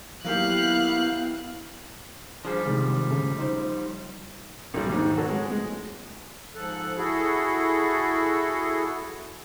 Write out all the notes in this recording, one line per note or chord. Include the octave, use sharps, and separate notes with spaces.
F#3 A#3 B3 E4 G4 F5 F#6
F3 G3 D4 G#4 C5
C3 D#3 G#3
C#3 A3
D#4 C5
B1 F#3 G3
D#2 G#2
F#4 A4 B4 C#5
G#3
G#3
G#2 F3 A4 F#6
E4 F#4 G#4 A4